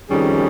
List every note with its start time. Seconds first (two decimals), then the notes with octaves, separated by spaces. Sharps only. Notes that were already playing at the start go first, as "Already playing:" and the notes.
0.10 F2 D#3 G3 C#4 G#4